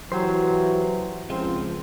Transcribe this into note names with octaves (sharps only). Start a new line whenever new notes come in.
E3 F#3 F#4 G4 C5
C#2 F3 G#3 C4